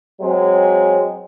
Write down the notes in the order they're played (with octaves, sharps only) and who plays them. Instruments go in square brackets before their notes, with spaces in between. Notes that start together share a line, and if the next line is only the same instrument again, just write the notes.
[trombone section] F#3 G#3 C4